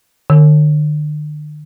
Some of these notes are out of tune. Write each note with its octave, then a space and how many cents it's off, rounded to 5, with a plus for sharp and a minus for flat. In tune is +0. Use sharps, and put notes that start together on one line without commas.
D3 +45